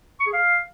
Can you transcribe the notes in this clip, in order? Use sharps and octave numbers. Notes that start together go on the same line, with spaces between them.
C#6
G#4
F5